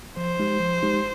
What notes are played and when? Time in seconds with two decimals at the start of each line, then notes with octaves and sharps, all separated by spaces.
0.17 F3 C5
0.39 G#3 D#4 G4
0.60 F3
0.83 G#3 D#4 G4